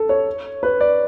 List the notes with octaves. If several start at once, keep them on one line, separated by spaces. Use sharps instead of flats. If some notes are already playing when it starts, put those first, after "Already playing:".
Already playing: A4
C#5
B4
D5